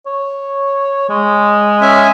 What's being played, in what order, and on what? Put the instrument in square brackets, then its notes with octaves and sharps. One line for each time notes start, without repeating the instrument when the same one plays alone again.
[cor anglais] C#5
G#3
[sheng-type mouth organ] C#4 E5 G#5